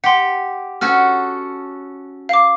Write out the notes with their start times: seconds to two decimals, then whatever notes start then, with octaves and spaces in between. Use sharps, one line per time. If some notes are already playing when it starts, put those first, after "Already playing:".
0.04 G4 F#5 C6
0.81 C#4 F#4 A4 F6
2.29 F5 D6